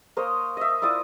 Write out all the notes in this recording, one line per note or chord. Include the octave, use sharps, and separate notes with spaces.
A#3 C5 C#5 D#5
D#5 E5
E4 F4 D5 D#6